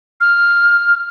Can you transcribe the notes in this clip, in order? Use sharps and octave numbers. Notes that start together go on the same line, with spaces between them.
F6